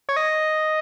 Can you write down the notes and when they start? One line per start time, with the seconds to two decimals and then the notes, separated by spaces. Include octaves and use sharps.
0.09 C#5
0.16 D#5